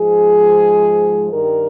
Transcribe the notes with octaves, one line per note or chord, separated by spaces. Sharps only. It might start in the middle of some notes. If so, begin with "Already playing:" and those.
Already playing: G#2 F3 G#3 G#4
G2 D#3 G3 A#4